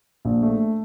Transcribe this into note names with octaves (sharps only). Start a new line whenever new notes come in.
A#1
A3